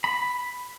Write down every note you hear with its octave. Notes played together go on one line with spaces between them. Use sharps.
B5